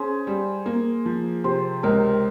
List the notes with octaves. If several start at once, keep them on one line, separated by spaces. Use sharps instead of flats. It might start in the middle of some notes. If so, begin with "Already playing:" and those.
Already playing: C#4 G#4 C5
G3
A#3
F3
C3 C5
C#2 A#4